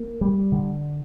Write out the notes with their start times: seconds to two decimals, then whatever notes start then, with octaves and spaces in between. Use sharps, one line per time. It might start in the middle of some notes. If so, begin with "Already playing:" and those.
Already playing: A#3
0.21 G3
0.52 D3